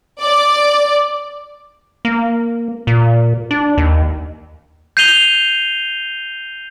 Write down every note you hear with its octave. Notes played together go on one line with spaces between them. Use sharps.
D5
A#3
A#2
D4
D#2
G6 C7 D#7 F7 G7